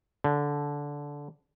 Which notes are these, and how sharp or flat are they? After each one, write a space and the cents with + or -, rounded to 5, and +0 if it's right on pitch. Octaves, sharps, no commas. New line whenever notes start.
D3 -15